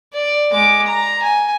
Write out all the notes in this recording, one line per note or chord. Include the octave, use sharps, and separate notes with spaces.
D5
G#3 D6
A#5
G#5